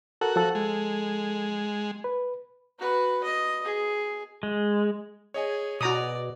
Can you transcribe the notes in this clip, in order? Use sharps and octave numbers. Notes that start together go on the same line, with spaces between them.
F#4 A4 A#4
F3 A4
G#3
B4
F#4 B4
D#5
G#4
G#3
G#4 C#5 D#5 G#5
B2 F#4 D5 A#5 D#6